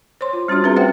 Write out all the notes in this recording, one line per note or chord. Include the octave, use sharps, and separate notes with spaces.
C5 C#5 C6
F4
G3 C#4 D4 F#4 C6
C4 G#4 B4 E5 A#5
A3 C5 E5 F#5 G5